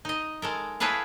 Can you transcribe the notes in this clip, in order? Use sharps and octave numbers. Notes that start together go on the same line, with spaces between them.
D#4 D#5
G#3 A4 A#4
E4 G#4 A4 B4 C#5 F5